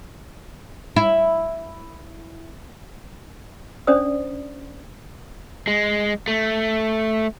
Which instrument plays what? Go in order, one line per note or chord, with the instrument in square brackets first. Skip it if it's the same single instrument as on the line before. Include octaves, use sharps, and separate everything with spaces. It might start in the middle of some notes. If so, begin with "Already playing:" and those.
[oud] E4
[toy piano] C#4 D4 C5 D5 D#6
[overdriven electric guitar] G#3
A3